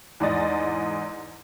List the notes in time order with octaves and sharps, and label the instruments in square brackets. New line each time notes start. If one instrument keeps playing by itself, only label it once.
[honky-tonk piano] E2 G#2 D5 D#5 A6